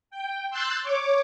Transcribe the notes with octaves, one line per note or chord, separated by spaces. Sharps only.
G5
C6 E6 F#6 G6 A6
C#5 D6